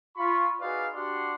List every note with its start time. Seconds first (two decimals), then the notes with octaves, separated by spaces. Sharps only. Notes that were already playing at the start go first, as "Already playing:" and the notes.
0.17 F4 B5 C#6
0.61 D#4 F#4 G#4 B4 D5 F5
0.94 D4 F#4 G4 D5 F#5 C6